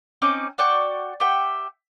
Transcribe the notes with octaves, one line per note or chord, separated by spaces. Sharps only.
C4 C#4 D#4 D6
F#4 D5 G5 C#6
G4 E5 F#5 G5